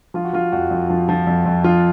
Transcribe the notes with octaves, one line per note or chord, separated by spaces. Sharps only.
F3 F4
F#4
F3 F4
F2 F#4
F2
F3
F3
F2
F2
F3 F4